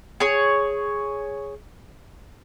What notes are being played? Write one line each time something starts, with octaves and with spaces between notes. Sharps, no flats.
G#4 C#5